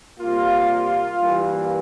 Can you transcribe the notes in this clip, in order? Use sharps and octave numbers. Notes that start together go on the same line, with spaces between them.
C3 G3 A#3 F4
G2 E3 G3 A#3